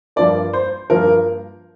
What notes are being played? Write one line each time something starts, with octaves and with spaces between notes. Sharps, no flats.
G2 F3 A#3 D5
C5
G2 F3 A#3 A#4